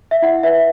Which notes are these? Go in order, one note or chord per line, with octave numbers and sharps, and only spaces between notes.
E5
E4 F#5
B4 E5